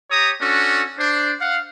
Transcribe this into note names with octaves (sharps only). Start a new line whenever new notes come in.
G4 C#5 A#5 D#6
C#4 D4 F#4 A4
D4 C5
F5 F#5